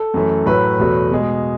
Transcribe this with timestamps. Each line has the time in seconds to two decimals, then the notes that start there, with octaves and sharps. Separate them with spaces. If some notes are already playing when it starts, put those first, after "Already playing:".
Already playing: A4
0.14 F#2 E3 A3
0.46 A2 F#3 A3 B4
0.79 E2 B2 F#3 A3
1.11 B2 G#3